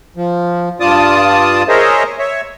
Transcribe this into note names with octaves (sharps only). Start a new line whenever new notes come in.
F3
G2 F4 D5 A5 D#6
G#4 A#4 C5 C#5 D#5 E5
C#5 E5